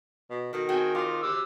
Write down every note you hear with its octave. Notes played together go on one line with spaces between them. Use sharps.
B2
B2 D#3 F#4 A4
C4 F#4 G#4 G5 G#5
F4 F#4 C6 D6
G4 D6 E6